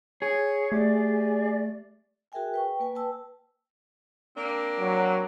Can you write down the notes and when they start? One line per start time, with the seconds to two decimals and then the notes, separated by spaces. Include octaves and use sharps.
0.22 G#4 C#5
0.72 A3 G4 D5
2.32 F#4 G#4 A#4 E5 G5 G#5
2.54 B4 G5 C#6
2.80 A#3 B4 G#5
2.95 B4 G5 A5 E6
4.35 A#3 C4 D4
4.80 F#3